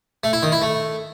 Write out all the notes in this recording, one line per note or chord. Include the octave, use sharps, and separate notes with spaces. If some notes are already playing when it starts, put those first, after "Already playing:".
A3
E4
D#3
E4
A3